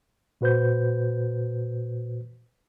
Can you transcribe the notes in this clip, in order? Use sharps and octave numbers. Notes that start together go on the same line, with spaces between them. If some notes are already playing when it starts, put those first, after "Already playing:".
A#2 F#4 B4 C5 G6